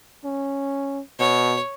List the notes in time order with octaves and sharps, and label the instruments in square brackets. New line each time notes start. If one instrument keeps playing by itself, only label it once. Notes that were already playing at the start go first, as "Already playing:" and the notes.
[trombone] C#4
[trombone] B2 [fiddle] C#5